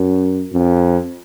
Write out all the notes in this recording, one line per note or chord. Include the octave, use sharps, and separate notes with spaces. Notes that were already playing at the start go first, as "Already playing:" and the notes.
Already playing: F#2
F2